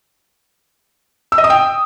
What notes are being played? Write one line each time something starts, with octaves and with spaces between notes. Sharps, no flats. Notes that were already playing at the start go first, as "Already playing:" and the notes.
E6
D#5
D#6
G5